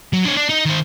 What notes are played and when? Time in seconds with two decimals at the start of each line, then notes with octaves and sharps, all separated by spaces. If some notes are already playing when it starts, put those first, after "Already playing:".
0.13 F#3
0.25 D4 C#5
0.37 D4
0.50 D#4
0.65 D#3 C5